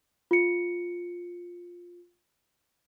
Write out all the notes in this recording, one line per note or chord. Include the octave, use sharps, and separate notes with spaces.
F4 C#7